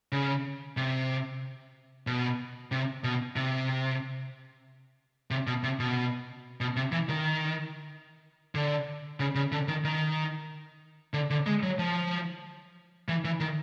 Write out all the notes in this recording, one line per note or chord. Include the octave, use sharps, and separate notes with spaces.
C#3
C3
B2
C3
B2
C3
C3
B2
C3
B2
B2
C3
E3
D#3
D3
C#3
C#3
D3
D#3
D#3
D3
D3
G#3
F#3
F3
E3
E3
D#3